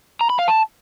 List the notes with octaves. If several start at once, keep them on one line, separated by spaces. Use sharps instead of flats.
A#5
B5
F5
A5